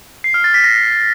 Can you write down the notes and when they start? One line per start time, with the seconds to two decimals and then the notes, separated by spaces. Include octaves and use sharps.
0.24 C7
0.34 F6
0.44 A6
0.54 B6
0.64 A#6